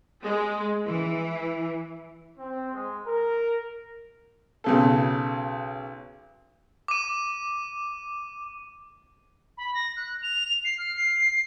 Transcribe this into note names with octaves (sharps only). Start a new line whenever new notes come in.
G#3
E3
C4
G#3
A#4
B1 C#3 A4
D6 D#7
B5
A#6
F#6
F7
C7
F6
C7